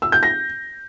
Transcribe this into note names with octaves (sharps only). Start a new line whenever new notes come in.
E6
G6
A#6